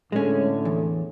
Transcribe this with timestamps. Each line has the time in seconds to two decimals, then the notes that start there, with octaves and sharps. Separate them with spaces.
0.12 A2 D3 G#3 C#4
0.65 E2